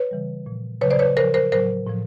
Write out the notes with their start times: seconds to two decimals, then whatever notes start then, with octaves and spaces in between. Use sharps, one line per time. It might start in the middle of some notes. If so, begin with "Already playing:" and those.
Already playing: B4 C#5
0.11 C#3 E3 G3
0.46 A#2 F3
0.81 C#3 F#3 B4 C#5
0.90 C5 D5
0.99 B4 C#5
1.17 C#3 F3 A#4 C5
1.34 A#4 C5
1.52 A2 F#3 A#4 C5
1.87 A2 F3